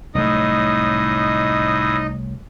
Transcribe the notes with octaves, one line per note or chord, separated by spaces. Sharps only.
C2 A2 F#3 A3 D#4 D#5 D#6